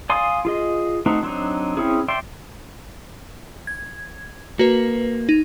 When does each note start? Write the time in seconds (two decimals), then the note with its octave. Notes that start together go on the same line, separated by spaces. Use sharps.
0.10 D5 F5 G#5 C6 D#6
0.45 F4 G#4 D#5
1.06 A3 C4 D#4 F#4
1.23 F#3 C4 D4 D#4
1.77 C4 C#4 E4 G#4
2.08 D5 E5 G5 C6
3.67 G#6
4.59 A#3 F#4 B4
5.29 D#4